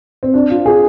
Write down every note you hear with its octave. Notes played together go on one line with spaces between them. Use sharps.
C4
D4
F4
G#4